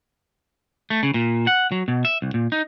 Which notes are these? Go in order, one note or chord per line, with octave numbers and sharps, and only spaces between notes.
A3
C#3
A#2
F#5
F#3
B2
E5
C2
A#2
D#4